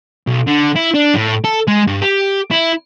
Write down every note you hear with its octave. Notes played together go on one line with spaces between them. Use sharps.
B1
D3
E4
D4
A2
A4
G#3
G2
G4
E4